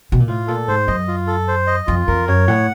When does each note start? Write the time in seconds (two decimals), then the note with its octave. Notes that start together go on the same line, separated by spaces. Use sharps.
0.12 B2
0.20 A#2
0.28 A2 F4
0.47 A#2 A4
0.68 G#2 C5
0.88 F#2 D#5
1.08 F4
1.27 A4
1.48 C5
1.67 D#5
1.87 F2 F4
2.07 F2 A#4
2.28 F#2 C#5
2.48 A2 F#5